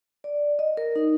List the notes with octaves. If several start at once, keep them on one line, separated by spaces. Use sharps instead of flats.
D5
D#5
A#4
D#4